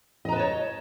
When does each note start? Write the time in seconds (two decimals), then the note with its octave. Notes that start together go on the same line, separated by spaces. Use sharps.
0.25 D#5
0.29 A#5
0.32 B4
0.36 A5
0.39 C#5